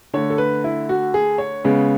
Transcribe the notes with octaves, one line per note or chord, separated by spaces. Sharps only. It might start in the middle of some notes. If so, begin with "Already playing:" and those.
D3 A3 C#5
A4
B4
E4
F#4
G#4
C#5
C#3 G#3 B3